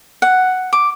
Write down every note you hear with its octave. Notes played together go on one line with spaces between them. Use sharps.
F#5
D6